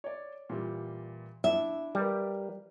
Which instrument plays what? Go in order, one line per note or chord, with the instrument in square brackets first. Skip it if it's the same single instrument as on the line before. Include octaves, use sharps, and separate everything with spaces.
[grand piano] C#5 D5
A#2 E3 G3
[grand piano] D4 E4 [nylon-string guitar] E5
[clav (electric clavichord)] G3 [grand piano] G4 A#4 B4